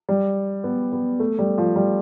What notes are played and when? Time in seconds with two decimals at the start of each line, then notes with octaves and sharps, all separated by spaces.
0.09 G3
0.64 B3
0.92 B3
1.20 A3
1.39 G3
1.58 F3
1.76 G3